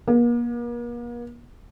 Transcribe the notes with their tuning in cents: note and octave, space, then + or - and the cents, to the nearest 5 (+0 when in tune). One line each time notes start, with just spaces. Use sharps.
A#3 +40